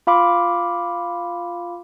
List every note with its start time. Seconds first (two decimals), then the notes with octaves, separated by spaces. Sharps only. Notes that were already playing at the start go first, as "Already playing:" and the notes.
0.07 F4 F5 B5 D6